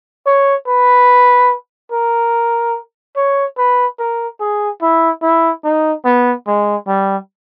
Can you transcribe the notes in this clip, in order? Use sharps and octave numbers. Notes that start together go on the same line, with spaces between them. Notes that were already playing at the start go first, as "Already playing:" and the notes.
C#5
B4
A#4
C#5
B4
A#4
G#4
E4
E4
D#4
B3
G#3
G3